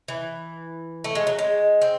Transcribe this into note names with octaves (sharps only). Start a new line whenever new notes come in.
E3
A3
G#3
F#3
G#3
C4